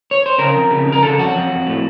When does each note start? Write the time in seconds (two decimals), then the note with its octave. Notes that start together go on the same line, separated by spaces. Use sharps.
0.11 C#5
0.26 C5
0.38 C#3 A#4
0.55 F2
0.71 C#3
0.87 C#3
0.92 A#4
1.02 C#3 A4
1.18 F2 F#4
1.35 F2
1.52 F2
1.67 A2